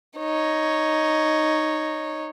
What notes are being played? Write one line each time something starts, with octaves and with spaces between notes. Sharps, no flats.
D#4 C#5